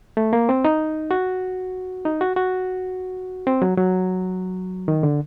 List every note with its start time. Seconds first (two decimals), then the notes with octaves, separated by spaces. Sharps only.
0.17 A3
0.33 A#3
0.49 C4
0.65 D#4
1.11 F#4
2.05 D#4
2.21 F#4
2.36 F#4
3.47 C4
3.62 F#3
3.77 F#3
4.88 D#3
5.03 D3